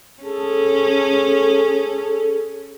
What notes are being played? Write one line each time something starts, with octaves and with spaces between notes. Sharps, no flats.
C#4 G#4 A4